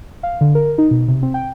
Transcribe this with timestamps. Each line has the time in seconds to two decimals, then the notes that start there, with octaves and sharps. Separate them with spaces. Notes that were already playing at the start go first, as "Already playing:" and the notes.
0.23 F5
0.41 D3
0.55 A#4
0.78 D#4
0.91 B2
1.08 C3
1.23 C4
1.34 G5